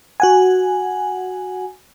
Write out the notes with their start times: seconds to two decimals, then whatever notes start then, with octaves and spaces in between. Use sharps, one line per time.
0.20 F#4 F#5 G#5